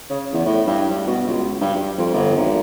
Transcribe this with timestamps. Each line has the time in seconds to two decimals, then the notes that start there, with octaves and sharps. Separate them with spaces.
0.10 C#3
0.33 E2
0.46 A2
0.67 G2
0.90 G2
1.07 B2
1.28 C#2
1.61 G2
1.76 G2
1.98 F2
2.14 G1
2.36 G#1